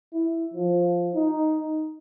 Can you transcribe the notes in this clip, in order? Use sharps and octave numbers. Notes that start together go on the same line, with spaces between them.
E4
F3
D#4